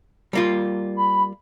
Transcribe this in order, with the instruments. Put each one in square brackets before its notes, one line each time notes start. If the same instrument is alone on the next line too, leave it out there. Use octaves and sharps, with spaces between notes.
[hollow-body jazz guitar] G3 A#3 F4
[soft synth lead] B5